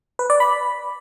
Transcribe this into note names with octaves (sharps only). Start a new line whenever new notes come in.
B4
D5
B5